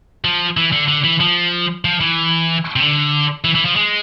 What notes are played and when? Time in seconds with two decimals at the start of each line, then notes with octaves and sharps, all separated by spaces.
0.25 F3
0.57 E3
0.72 D3
0.88 D3
1.04 E3
1.20 F3
1.85 F3
2.00 E3
2.76 C3
2.80 D3
3.44 E3
3.55 E3
3.65 F3
3.76 G#3